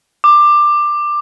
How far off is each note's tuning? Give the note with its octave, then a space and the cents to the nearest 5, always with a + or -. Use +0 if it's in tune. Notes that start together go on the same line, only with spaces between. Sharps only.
D6 +15